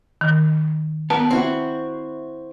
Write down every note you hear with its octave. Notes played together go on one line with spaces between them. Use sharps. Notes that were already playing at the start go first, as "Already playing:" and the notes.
D#3
B3 A#4 A5
C4 E4 F#4